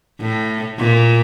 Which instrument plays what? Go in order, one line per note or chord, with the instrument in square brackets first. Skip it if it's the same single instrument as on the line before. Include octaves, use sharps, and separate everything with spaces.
[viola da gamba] A2
A#2